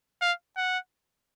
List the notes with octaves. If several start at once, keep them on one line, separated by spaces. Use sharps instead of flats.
F5
F#5